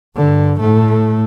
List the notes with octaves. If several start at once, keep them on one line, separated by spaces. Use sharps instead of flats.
G2 D3
A2 A3